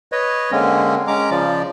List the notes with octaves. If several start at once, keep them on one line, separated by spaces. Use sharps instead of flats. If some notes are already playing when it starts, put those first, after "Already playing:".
B4 C#5 D#5
D3 G#3 A#3 C4 C#4
G#3 C#4 A#5 D6
C#3 F3 D5